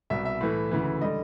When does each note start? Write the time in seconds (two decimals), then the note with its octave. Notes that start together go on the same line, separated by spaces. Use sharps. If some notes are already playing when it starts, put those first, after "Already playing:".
0.10 C2 B2 G3 E5
0.25 E5
0.41 A2 E3 A3
0.71 D2 C#3 E3
1.01 D3 G3 D#5